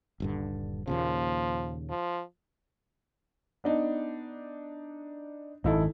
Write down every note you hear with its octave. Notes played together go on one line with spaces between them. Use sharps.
D#1 G2 D3
D#2 A#2 C#3 F3
F3
B3 D4 D#4
G#1 F#2 D#4 E4 A4